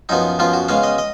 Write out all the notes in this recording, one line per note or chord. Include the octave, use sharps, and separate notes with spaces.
F#2 F3 B3 D#4
F#2 F3 B3 F4
F#4
C#3 G#3 B3 F5
D#5
D#5